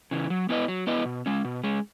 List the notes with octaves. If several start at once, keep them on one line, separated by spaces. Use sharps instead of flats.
C#3 E3
F#3
B3 E4 B4 D#5
F#3
B3 E4 B4 D#5
B2
G#3 C#4
B2
G#3 C#4